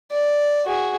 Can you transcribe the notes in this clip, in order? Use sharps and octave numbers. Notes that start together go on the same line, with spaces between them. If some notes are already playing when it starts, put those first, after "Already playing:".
D5
F#4 G#4